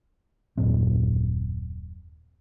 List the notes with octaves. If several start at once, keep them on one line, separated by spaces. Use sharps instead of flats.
D#1 F#2 A#2 C4